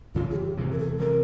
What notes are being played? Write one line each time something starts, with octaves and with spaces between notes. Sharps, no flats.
F#2 C#3 E3 F4
G#4
G4
E2 C3 E3 G#3
A#4
A4
C3 E3 G#3 A#4